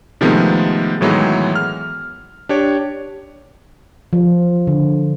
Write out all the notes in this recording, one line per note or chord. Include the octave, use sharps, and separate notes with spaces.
C3 D#3 F3 G#3 A3 B3
A2 D#3 E3 F#3 G#3 B3
F6
D4 G4 C#5
F3
D3